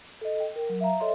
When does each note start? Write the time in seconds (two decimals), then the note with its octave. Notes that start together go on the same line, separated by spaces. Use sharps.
0.21 A4 D#5
0.40 G5
0.56 A#4
0.69 F#3
0.81 E5 F5 A#5
1.00 A4 C#5 D#5 E5 C6